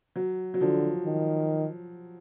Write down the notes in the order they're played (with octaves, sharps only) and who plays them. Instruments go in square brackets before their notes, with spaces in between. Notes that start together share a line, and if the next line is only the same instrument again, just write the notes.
[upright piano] F#3
F#3
[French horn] D3 [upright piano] F3
[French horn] D#3